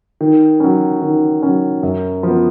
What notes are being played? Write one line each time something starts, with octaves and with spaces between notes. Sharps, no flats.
D#3
F#3 C#4
D#3
F#3 C#4
F#2
F3 B3